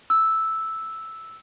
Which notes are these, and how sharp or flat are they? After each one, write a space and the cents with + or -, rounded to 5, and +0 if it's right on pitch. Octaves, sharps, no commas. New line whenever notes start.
E6 -5